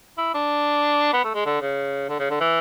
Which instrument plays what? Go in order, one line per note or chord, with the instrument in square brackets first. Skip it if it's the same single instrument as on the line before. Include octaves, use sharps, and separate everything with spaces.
[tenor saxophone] E4
D4
B3
A3
G#3
D3
C#3
D3
C#3
D3
E3